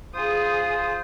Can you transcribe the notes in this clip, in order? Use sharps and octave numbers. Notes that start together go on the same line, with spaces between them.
F4 G#4 C5 D#6